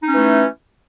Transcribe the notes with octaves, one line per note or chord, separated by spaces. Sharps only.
E3 A3 C#4 D#4